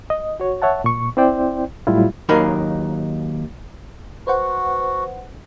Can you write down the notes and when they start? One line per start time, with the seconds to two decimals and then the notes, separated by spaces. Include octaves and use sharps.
0.10 D#5
0.40 F#4 C#5
0.62 C#5 E5 F#5 A5
0.84 A#2 C#6
1.17 C4 E4 C5 D5 G5
1.87 A2 F#3 G3 E4 F4
2.29 D#2 F#3 D#4 A#4 F5 B5
4.27 F#4 B4 C5 F#5